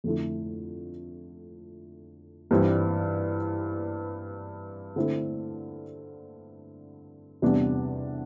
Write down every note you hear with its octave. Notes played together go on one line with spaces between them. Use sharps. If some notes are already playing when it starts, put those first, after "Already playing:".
F2 D3 A3 E4
G2 E3 G3 C4
D3 A3 C4 E4 A4
E2 C3 G3 B3 D4